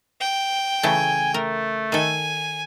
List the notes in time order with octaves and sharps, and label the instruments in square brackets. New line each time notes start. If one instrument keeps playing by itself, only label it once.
[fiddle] G5
[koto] C#3 E3 A3 [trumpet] G#5
[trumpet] A3 [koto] A#4
[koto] D#3 A4 [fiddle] G#5